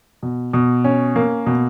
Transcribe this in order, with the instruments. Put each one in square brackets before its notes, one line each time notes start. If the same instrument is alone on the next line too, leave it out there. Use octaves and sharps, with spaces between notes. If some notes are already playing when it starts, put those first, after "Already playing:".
[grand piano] B2
B2
C#4
A#3
B2